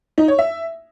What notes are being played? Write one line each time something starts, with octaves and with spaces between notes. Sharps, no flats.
D#4
C#5
E5